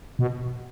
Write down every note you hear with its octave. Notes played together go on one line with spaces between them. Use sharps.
B2